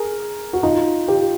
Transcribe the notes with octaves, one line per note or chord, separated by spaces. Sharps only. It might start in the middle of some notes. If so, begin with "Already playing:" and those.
Already playing: G#4 A#4
F#4
D#4 F4
F4 G4